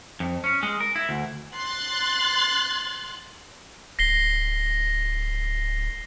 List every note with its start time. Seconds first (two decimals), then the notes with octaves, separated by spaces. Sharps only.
0.20 F2
0.44 C#4
0.63 G#3
0.80 A#4
0.96 E4
1.09 D2
1.56 C6 F#6 A6
3.99 D1 A#6 C7 G7